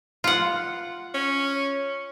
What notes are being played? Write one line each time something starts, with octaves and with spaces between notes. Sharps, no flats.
F4 F#5
C#4